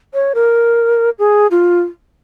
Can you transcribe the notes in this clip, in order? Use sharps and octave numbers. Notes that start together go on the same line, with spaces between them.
C#5
A#4
G#4
F4